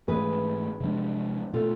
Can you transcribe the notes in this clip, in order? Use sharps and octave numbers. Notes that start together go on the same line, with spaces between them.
G#2 E3 A3 G#4 B4
C3 F3 G#3 D4
B2 A3 F4 A4